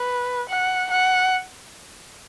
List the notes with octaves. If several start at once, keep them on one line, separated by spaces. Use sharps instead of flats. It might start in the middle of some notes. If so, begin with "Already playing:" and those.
Already playing: B4
F#5
F#5